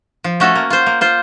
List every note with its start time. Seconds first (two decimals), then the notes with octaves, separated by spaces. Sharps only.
0.24 F3
0.40 A3 C#4 F#4 A4
0.55 A#3
0.70 F4 C5
0.86 A#3
1.01 F4 C5